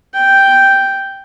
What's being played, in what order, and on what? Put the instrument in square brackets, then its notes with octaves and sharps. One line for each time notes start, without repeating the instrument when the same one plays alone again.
[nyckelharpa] G5